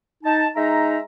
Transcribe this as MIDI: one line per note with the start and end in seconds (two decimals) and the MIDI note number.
0.24 0.47 63
0.24 0.47 81
0.55 1.00 56
0.55 1.00 63
0.55 1.00 76
0.55 1.00 82